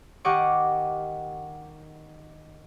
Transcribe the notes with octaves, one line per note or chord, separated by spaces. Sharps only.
D#3 G4 D#5 F#5 C#6 D6